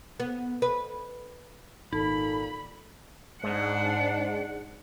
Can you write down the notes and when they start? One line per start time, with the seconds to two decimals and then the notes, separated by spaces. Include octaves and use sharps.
0.20 B3
0.62 B4
1.93 G#1 A#2 D#4 A4 B5
3.43 G#2 D4 F#5